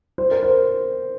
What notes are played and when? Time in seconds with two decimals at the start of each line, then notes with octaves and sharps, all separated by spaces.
0.18 C5
0.31 A#4
0.43 C5